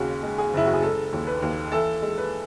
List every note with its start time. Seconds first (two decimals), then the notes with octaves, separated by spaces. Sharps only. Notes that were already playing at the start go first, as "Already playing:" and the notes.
Already playing: D#2 C#3 F#4
0.23 G#3
0.38 G#4
0.54 F#1 E4
0.66 F#4
0.73 G#4
0.82 G#3 A4
1.13 D#2
1.27 B4
1.42 D#2
1.72 E3 A4
2.02 G#3
2.18 B4